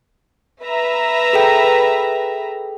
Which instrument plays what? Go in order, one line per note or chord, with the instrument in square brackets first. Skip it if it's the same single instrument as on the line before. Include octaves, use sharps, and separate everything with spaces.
[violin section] B4 E5 A#5
[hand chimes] G#4 A4 G5